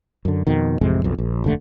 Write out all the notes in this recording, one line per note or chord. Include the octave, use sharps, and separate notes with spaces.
F#2 D3
F2 B2 D#3
A1 F2 C3 G#3
B1 F2
A#1
F1 D#2 D3 A3